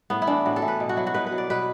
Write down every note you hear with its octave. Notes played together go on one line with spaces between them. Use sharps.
A2 B3
E4
E3 D4
A2 F#4
A4
E3
B4
B2
F#4
F#3 E4
F#4
B2 B4
B4
F#3
D5
B2 B4